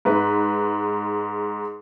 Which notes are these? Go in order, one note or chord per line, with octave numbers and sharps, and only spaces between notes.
G#2 B4